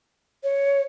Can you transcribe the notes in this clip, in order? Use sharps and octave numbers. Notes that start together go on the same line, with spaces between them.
C#5